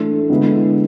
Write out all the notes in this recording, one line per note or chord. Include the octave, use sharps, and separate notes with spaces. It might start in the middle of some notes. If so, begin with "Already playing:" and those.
Already playing: A2 E3 A3 D4
D3 G#3 B3 E4